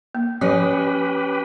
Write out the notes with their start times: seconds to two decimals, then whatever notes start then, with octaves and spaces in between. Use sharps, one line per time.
0.15 A#3
0.41 F3 C#4 G4 B4 C#5